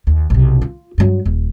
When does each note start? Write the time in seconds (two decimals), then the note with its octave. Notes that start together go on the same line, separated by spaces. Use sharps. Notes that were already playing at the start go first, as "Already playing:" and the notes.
0.07 D#2
0.30 B1 C3
0.62 F4
0.98 G2 F#3
1.25 D#1